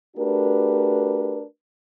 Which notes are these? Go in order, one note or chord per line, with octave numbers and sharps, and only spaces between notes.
A3 D4 F#4 G4 A#4 B4